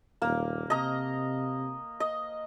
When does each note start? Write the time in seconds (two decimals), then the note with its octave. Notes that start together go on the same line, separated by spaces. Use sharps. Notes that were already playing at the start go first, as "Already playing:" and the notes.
0.22 D#1 A#3
0.70 C3 D#5 A#5
2.00 D#5